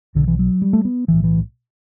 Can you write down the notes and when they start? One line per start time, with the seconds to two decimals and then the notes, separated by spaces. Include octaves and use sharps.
0.15 B1 B2 D3
0.28 E3
0.39 F#3
0.62 G3
0.73 A3
0.85 B3
1.08 B1 A2 E3
1.24 E3